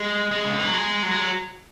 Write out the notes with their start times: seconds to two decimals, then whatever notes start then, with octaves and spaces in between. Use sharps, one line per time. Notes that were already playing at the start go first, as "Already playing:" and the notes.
Already playing: G#3
0.31 G#3
0.45 C#3
0.52 D3
0.59 E3
0.67 F#3
0.74 G#3
1.03 F#3
1.11 G#3
1.20 F#3